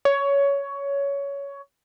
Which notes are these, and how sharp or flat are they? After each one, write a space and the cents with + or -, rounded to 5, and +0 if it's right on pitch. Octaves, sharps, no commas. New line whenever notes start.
C#5 +15